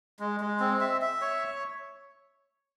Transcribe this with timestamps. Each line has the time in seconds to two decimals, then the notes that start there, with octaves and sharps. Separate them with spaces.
0.20 G#3
0.40 G#3
0.60 C4
0.81 E5
1.01 E5
1.22 C#5